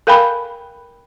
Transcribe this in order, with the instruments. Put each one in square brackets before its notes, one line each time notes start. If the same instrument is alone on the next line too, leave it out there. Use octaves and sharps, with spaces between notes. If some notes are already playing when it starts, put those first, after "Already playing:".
[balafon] A4 A#4 F5 G5 G#5 B5